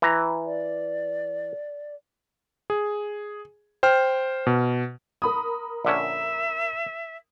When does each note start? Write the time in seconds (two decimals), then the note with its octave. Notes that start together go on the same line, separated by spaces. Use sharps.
0.02 E3 A#5
0.45 D5
2.70 G#4
3.83 C5 G5 F6
4.47 B2
5.22 A#4 B5 D#6
5.85 A#1 D3 C#4 E5